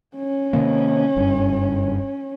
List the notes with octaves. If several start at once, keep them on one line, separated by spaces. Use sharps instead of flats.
C#4
C3 D#3 A#3
F#1 G2